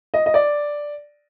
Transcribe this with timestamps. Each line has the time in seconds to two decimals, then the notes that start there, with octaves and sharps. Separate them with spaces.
0.14 D#5
0.26 D#5
0.34 D5